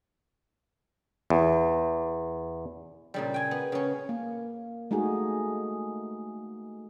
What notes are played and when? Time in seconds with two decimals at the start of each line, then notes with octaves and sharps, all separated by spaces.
1.30 E2
3.14 A#2 C#3 G3
3.34 G5 G#5
3.51 B3
3.72 C#3 C#4
4.09 A#3
4.91 G#3 A3 D#4 F#4 G#4